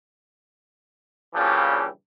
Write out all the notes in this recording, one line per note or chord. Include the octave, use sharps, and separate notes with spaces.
G2 A#2 C#3 E3 F3 G3